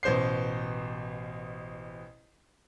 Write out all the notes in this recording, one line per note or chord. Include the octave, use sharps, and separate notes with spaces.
A1 B2 C5 G6 C7